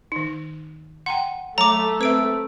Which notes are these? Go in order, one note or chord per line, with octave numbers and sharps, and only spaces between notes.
D#3 D#4
F#5 G5 A#5 C6
F#3 A3 C#5 A#5 D6
C4 B4 E5 E6 D7